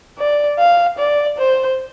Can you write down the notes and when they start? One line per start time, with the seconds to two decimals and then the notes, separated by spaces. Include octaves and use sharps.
0.19 D5
0.59 F5
0.99 D5
1.38 C5